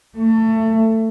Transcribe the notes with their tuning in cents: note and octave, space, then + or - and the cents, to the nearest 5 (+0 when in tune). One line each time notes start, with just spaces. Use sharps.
A3 +25